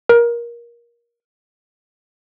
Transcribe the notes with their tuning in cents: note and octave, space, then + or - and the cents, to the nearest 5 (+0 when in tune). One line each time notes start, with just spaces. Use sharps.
A#4 +20